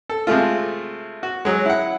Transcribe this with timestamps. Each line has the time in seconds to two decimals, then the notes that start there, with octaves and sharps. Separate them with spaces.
0.09 A4
0.27 C3 G#3 A3 F4
1.23 F#4
1.45 F#3 G#3
1.65 E4 F#5